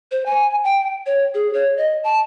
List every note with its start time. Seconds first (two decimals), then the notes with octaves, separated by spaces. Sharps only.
0.11 C5
0.26 G#5
0.64 G5
1.06 C#5
1.34 G#4
1.53 C#5
1.77 D#5
2.04 A5